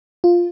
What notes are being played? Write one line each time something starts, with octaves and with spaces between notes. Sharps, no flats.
F4